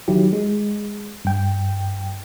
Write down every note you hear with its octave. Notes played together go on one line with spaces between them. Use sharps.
D#3 F#3 E4 G4
G#3
G2 G5